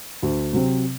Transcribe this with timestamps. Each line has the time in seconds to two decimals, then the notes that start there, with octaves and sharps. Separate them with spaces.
0.23 D2
0.53 C3 F#3 C4